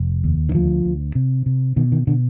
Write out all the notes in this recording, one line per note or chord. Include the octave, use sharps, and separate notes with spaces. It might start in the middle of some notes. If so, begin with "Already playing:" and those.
Already playing: F1
D#2
D#3
D2 F3
D2
C3
C3
B2 D#3
D#3
B2 D3